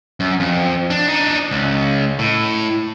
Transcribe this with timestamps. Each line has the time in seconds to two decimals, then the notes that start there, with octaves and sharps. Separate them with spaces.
0.20 F#2
0.40 F2
0.90 D4
1.08 D4 D#4
1.51 C#2
2.19 A2